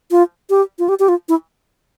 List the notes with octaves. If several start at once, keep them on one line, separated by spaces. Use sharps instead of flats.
F4
G4
F4
G4
G4
F4
E4